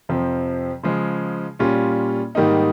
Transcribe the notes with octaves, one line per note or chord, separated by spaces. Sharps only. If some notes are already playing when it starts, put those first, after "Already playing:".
F2 C3 F3 C4
C#3 F3 G#3
A#2 G3 C#4 F4
G#2 D#3 G3 A#3 D#4